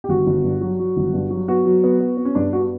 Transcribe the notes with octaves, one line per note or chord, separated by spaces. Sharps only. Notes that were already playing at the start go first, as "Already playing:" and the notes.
G4
G1 F#4
G1
G2
F#3
F#3
G1
G2
F#3
B3 F#4
F#3
B3
B3
B3
C#4
G2 D4
B3 F#4